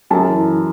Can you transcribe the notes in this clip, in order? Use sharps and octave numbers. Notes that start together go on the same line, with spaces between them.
F#2 A5
E3
E3